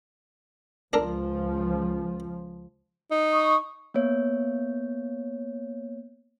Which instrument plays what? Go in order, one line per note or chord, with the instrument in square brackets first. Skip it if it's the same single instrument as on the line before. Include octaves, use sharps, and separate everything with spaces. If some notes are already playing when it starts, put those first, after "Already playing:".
[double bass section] C#2 F3 [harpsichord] D4 A4 A#4
[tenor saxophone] D#4
[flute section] C#6 D#6
[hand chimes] A#3 B3 C#5